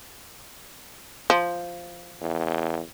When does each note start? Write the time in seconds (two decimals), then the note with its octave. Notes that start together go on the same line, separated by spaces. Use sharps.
1.30 F3
2.21 E2